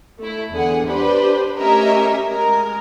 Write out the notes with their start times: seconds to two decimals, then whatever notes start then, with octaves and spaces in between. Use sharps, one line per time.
0.19 A3 E4
0.52 E2 D3 G#4 F#5
0.86 D4 G4 B4 C5 D5
1.58 A3 C#4 G4 A#4 D#5 E5
2.27 G#3 A#4